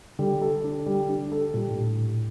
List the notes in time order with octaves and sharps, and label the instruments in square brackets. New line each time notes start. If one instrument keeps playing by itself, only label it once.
[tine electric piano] D3 [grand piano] G3
[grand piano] A4
D4
G3
D4
A4
[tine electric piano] A#2 [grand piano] G3
[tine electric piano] A2